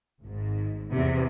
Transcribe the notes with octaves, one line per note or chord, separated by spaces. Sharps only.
G#1 G#2
E2 C3